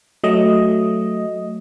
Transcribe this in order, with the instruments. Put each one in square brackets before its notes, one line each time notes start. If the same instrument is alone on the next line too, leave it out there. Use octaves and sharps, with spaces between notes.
[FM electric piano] F#3 A3 D#5